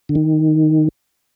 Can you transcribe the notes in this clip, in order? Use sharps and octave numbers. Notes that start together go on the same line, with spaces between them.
D3
D#3